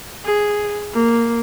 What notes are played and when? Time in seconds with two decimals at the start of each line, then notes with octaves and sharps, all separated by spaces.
0.25 G#4
0.93 A#3